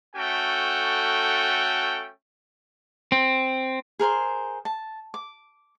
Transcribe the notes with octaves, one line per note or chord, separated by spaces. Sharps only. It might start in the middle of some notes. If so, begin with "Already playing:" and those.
A3 C#4 F#4 A4 G5
C4
G#4 A#4 C5 C6
A5
D6